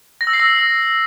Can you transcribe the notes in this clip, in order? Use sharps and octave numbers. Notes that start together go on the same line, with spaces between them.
A#6
E6
C7
E6